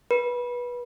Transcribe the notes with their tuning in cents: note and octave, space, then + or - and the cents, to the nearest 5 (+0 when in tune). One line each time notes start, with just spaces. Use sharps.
B4 -20